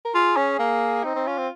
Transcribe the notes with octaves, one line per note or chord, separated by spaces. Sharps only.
A#4
F4 G#4
C#4
A#3
C4 D#4
C4
C#4 F4
C4